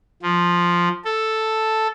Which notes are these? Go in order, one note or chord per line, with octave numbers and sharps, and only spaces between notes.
F3
A4